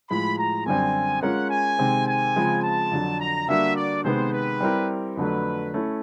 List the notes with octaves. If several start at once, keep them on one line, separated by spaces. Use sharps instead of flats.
A2 F3 G#3 B5
A#5
F#2 D3 G3 C4 G#5
G#3 C#4 F4 A#4 F#5
G#5
C3 D#3 G#3 C4
G#5
C#3 F3 G#3 C4
A5
F2 D3 F#3
A#5
D3 G3 A#3 D4 F#4 E5
D5
C3 D#3 G#3 B3 C5
B4
G3 C4 E4 G4 A#4
F2 D3 F#3 A3 B4
A3 C#4 E4